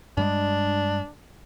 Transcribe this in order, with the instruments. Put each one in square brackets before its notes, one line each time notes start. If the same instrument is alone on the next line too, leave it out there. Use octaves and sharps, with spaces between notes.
[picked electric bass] G2 G3 G#3 [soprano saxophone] D4